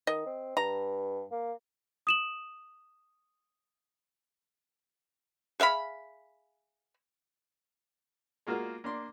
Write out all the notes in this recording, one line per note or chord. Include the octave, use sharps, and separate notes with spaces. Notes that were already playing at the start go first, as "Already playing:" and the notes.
D#3 D#5
C4
G2 A#5
A#3
D#6 E7 F#7
G#4 E5 F5 B5
G#3 A#3 F4 F#4 A#4
A#3 D4 C6